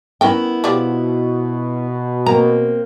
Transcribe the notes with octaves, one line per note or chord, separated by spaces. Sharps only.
B3 C#4 E4 A#4 G5
B2 F3 G4 D5
A#3 C4 A#5